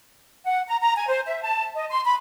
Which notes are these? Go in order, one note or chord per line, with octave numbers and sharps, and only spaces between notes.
F#5
A#5
A#5
G#5
C5
E5
A5
D#5
C6
B5